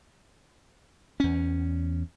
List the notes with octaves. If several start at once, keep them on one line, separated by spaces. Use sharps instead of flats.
E2 C#4